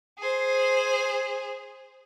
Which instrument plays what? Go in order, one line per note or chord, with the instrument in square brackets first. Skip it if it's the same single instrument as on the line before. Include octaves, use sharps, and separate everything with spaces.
[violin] G#4 C5